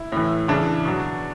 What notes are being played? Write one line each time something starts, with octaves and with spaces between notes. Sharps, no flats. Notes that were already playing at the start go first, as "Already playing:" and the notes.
Already playing: E4
A2 E3
C#3 E3 D4
B2 F#3